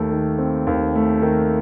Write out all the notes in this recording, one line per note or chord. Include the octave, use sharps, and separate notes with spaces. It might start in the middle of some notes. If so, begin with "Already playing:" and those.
Already playing: D#2 A3
D#3
C4
D#2
A3
D#3